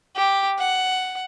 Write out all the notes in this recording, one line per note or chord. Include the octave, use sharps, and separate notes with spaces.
G4
F#5